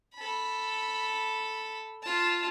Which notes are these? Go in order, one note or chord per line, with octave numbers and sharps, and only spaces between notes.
A4 B5
F4 A5